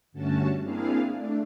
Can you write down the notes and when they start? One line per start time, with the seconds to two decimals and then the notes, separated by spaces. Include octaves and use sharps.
0.12 G2 D3 A3 C#4 F#4 A5
0.63 A#3 C4 D4 E4 G#4 F5
1.11 A3 D4